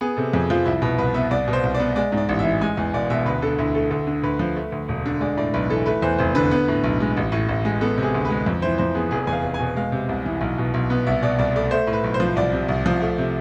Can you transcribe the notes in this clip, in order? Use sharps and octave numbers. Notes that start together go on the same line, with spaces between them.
B3 G#4
C3 A4
F2 G#4
F3 F4
C2 E4
B2 E4
C2 B4
B3 E5
C2 D5
B2
C5
C2
D5
B3
G#3 D5
G#2
D5
A1
E5
E3
G#3 G#5
E2
E1 D5
B2 E5
D2 B4
D3 A4
D2 E4
A3 A4
D2 A4
D3
D2 B4
F3
A3
D2
E1
D3
G#3 D5
A2 D5
B1 B4
E3 A4
A3 B4
E2 C5
F1 C5
D3 B4
B3
A2
B1
G#3
A1
A2
A1
G#3
B3 A4
C3
G#4
D2
B4
G#3
F2
E3 C5
F2 C5
B3 G#4
F1 G#4
E2 G#5
F5
F1
G#5
B2
G#3 F5
C3
C2
E3
B1
B2
B1
B3
C2 E5
B2 D5
C2 D5
A3 D5
A3 C5
A2
B4
B1
C5
F3
C2 D5
C3
C2
F3
A3
C3